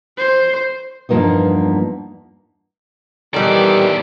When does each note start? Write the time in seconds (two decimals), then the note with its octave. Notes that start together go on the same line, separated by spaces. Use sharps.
0.18 C5
1.09 E2 G2 F3 A#3 B3 D#4
3.34 D#2 D#3 E3 G3 B3 A4 D5